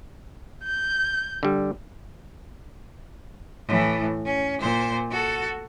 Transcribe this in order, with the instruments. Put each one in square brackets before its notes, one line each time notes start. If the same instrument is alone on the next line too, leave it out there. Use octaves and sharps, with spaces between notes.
[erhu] G6
[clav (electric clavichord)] D3 G3
[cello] A2 E3
C#4
A#2 C5
F#4 A4